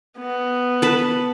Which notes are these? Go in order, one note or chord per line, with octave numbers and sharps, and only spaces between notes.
B3
B4 A5